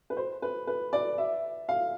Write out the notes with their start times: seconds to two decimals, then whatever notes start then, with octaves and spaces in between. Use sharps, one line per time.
0.10 B4
0.17 C5
0.42 B4
0.67 B4
0.93 D5
1.18 E5
1.69 F5